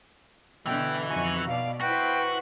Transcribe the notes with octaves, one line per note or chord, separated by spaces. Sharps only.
B2 D3 E3 E4 G5
F2 D#4 F#4 G#5
B2 D5 F5
E4 F#4 B4 C5 G5